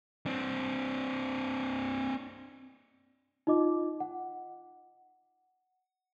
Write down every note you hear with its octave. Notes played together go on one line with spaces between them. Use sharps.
C4 D4
D#4 F4 D#5 D6
F#5